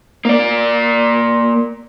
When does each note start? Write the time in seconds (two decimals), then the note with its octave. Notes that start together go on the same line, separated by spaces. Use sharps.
0.25 A#3 D5